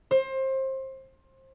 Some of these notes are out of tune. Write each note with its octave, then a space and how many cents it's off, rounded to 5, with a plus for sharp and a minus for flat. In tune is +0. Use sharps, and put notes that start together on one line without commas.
C5 +25